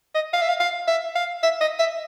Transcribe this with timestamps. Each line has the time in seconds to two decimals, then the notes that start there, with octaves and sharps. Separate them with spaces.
0.15 D#5
0.33 F5
0.42 E5
0.49 F5
0.60 F5
0.88 E5
1.15 F5
1.43 E5
1.61 D#5
1.79 E5